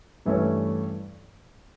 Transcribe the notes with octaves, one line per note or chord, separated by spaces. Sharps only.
G2 E3 A3 C#4